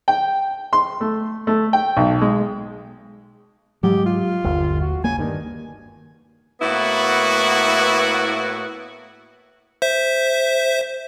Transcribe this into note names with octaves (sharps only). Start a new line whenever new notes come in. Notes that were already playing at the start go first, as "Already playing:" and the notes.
G5
C6
A3
A3
G5
B1
G#3
G#2 F#3 G#3 G4
F4
G1 D#2
F#4
C#3 A#3 G#5
G2 D#3
A2 A#3 B3 E4 F#4
C5 E5